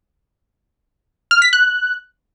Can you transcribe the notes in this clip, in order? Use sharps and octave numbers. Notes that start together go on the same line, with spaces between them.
F6
B6
F#6